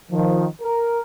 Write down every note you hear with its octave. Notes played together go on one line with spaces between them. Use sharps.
D#3 F3
A#4